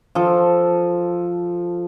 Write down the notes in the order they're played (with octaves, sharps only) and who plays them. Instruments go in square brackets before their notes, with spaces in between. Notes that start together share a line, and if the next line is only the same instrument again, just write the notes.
[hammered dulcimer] F3 A4